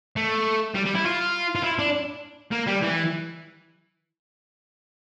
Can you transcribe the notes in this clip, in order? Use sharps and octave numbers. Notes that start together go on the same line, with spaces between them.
A3
G3
G3
E4
F4
F4
E4
D4
A#3
G3
E3